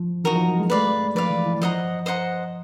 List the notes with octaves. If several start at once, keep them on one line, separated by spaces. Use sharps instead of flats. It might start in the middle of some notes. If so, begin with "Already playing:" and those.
Already playing: F3
E3 D#4 F#4 A#4
F3
F#3
G#3
A3 B4 D5 F5
G#3
F3 B4 D5 F5
E3
E3
F3 C5 D#5 F#5 A#5
C5 D#5 F#5 A#5